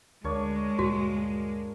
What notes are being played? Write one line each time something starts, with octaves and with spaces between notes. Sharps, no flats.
D2 G#3 A#3 D4 C#5
D2 G2 A#2 F#4